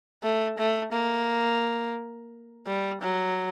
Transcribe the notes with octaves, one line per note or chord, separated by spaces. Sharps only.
A3
A3
A#3
G3
F#3